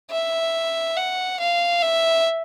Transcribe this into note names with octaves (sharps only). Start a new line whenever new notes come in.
E5
F#5
F5
E5